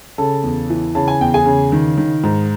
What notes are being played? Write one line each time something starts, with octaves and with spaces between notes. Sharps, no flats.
C#3 A4 A5
E2
E3
C#3 A5
G#5
E2 G5
G#4 G#5
C#3
D#3
D#3
G#2